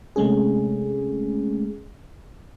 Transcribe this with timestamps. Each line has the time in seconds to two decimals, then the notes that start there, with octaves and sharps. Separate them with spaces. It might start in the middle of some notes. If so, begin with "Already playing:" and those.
0.16 C3 G#3 A3 C#4 G#4